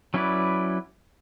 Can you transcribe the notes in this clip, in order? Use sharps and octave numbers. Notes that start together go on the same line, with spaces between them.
F#3 C#4 E4 B4 D5